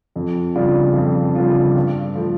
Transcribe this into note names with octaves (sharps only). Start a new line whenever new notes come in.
F2
C#3 G3 D4 F4
F2
C#3 G3 D4 F4
G2
F3 A3